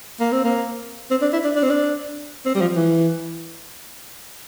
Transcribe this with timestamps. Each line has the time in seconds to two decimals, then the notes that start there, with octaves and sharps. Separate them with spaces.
0.20 A#3
0.32 C4
0.44 A#3
1.11 C4
1.22 D4
1.33 E4
1.44 D4
1.56 D4
1.63 C4
1.70 D4
2.46 C4
2.55 G3
2.61 F3
2.76 E3